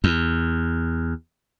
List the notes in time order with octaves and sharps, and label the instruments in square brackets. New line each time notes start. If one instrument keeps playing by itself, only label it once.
[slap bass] E2